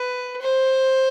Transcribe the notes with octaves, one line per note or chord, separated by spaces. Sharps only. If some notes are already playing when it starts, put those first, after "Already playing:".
Already playing: B4
C5